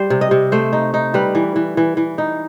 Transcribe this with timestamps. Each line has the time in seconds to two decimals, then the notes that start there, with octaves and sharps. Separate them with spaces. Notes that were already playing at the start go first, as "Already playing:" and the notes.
Already playing: G3 C5
0.10 C3
0.21 D#5
0.31 C3
0.52 A3 C5
0.73 D#4
0.94 D#4
1.14 G3 B4
1.35 E3
1.56 E3
1.77 E3
1.97 E3
2.18 D#4